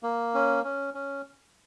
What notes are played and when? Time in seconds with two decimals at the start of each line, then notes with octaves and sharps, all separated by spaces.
0.03 A#3
0.34 C#4
0.64 C#4
0.94 C#4